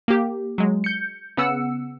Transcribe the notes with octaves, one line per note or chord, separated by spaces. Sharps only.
A#3 G4
F#3 G#3
G6 C#7
C#3 B3 F#5 E6 C#7